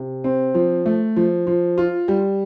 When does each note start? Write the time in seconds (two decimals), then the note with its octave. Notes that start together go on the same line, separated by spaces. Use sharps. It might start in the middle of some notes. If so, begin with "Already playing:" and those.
Already playing: C3
0.24 C4
0.54 F3
0.86 A3
1.16 F3
1.47 F3
1.78 F4
2.08 G3